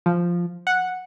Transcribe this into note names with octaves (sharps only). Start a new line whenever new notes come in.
F3
F#5